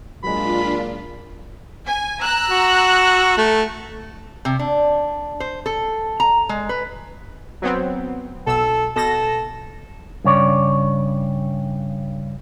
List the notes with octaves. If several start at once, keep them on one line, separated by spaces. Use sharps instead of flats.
A#2 F#3 G#3 D4 F4 B5
G#5
A#5 E6 F#6
F#4
A3
C3
D4
C5
A4
A#5
G#3
B4
F#3 B3 C4
B1 A4 E6
B2 A4 A#6 E7
G2 C#3 C#5 D5